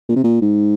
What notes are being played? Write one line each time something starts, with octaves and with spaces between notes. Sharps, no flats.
A#2
C3
A#2
G#2